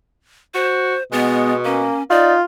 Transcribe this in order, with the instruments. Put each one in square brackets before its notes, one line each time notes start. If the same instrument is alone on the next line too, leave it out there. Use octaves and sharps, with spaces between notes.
[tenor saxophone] F#4 [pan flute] C5
[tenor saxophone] B2 [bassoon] G#3 [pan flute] B3
[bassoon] A#3 [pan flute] C#4
[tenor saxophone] D#4 [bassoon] F4 [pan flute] D5